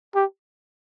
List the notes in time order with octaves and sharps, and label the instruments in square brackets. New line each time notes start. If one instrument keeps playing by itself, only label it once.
[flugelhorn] G4